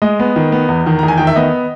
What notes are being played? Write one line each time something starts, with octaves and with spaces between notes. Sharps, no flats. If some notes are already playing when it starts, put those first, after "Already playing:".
G#3 D#5
B3
D#3
B3
E2
D#3
E2 A#5
G#5
D#3 G5
E5
B3 D#5